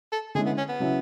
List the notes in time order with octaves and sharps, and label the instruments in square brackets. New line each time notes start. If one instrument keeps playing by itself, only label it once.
[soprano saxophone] A4
[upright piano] D3 G#3 C#4 E4 [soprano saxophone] G#4
[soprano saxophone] B3
C#4
B3
[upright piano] C#3 F#3 C#4 E4